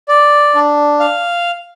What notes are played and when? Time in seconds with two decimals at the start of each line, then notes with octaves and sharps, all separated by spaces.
0.08 D5
0.55 D4
1.00 F5